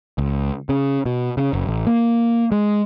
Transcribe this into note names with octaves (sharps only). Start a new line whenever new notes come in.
C#2
C#3
B2
C#3
F#1
A1
A#3
G#3